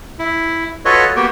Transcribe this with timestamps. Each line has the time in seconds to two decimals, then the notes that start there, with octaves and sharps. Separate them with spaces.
0.19 E4
0.85 F4 F#4 A4 B4 C#5 D#5
1.16 A#3 B3 F#4 G4 G5